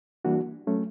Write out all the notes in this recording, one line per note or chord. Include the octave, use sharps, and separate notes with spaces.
E3 G3 A#3 D4 F#4
F#3 A3 C#4